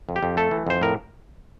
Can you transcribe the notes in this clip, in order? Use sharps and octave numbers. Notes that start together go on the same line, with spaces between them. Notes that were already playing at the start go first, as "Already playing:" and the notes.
F2
G4
F2
A3 A4
E3
F2 C5
A2 A#4